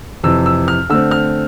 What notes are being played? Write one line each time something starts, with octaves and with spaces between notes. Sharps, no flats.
F2 C3 E3 E6
E6
F6
D3 A3 C4 E6
F6